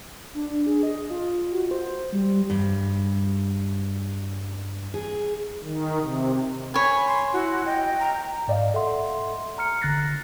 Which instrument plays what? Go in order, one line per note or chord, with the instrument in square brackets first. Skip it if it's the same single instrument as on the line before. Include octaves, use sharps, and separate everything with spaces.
[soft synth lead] D4
G#4
D#5
F4
F#4
C5
G3
[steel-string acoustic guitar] G2
G#4
[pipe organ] D#3
C3
[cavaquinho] C#5 G#5 [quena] B5
[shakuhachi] C6
[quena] E4 [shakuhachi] F#4
[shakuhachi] D#5 [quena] G5
[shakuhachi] A#5
[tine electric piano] G#2 D5 D#5 F5
A4 E5 F#5 C6
A#5 F6 C#7
G1 D3 F#6 A6 A#6 C7